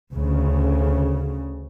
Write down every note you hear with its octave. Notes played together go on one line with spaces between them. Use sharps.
D2 C#3